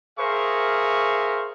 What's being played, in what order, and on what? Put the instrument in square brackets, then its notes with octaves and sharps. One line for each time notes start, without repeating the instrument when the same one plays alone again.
[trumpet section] G#4 A#4 C5 E5 F5 C#6